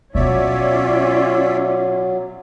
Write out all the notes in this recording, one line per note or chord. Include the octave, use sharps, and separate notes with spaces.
B2 F#3 C#4 F4 C#5 D5 E5